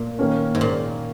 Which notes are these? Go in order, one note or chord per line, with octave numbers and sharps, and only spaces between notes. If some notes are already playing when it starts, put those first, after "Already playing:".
Already playing: A#2
D#3 A#3 C#4
G#2
A#2